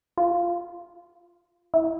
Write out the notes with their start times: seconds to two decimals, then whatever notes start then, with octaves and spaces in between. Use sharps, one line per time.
0.18 F4
1.74 E4